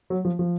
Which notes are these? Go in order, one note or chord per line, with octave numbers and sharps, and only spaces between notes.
F#3
F3
F3